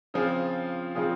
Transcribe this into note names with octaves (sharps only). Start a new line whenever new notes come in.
C#3 F3 C4 F4 G#4
C#3 F3 C4 F4 G#4